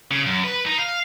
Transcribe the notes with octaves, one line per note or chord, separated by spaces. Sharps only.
C#3
F#2
B4
D#4
F5